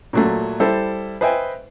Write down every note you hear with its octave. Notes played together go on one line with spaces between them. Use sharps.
A#2 F#3 A3
G3 E4 A4 C5 E5
B4 C5 D#5 E5 G5 G#5